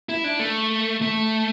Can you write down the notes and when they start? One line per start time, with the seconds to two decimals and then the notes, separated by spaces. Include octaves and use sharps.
0.09 E4
0.24 D4
0.39 A3
1.02 A3